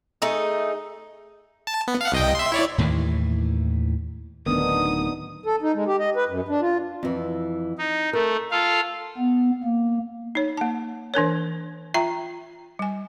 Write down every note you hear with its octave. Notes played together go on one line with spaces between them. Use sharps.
A3 D#4 G#4
A5
B3
F5 F#5
C2 D#5 G5
E5 C6
E4 C#5 D5
D#2 A2 D#3 E3
D1 A#1 D#3 B3 D4 D#4 D#6
A4
D#4
G#3
G4
D#5
B4
F#2
D4
F4
F2 E3
D#4
A3 A#4
F4 A4 F5
B3
A#3
D#4 C#5
A#3 A5
E3 D4 A#4 C#5
F4 E5 G5 A#5
G3 G#5